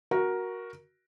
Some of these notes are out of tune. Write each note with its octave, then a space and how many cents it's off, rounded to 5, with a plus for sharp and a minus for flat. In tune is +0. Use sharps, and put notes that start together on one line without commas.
F#4 +0 A#4 +10